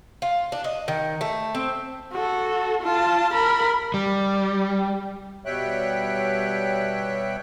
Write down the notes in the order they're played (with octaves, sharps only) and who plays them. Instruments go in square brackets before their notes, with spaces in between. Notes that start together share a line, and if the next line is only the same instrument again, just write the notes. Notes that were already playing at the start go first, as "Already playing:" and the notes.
[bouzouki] F4
D4
D#5
D#3
A3
C4
[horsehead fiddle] F#4 A4
F4 A5
A#4 B5
[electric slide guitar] G3
[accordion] B2 G3 C#5 E5 G5 F#6